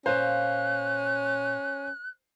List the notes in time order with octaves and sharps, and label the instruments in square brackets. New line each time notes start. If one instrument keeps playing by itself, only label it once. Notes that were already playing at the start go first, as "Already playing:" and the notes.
[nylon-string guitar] A#2 F5 [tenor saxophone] C#4 [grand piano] C5 [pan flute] F#6